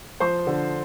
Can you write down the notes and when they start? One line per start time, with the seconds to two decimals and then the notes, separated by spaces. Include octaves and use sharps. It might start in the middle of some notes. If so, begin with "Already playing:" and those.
0.20 F3 C5 C6
0.47 D3